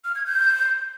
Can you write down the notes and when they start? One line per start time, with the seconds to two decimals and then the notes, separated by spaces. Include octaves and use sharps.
0.04 F6
0.15 G#6
0.26 G6